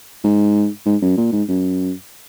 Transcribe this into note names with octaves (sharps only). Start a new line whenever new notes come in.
G#2
G#2
F#2
A#2
G#2
F#2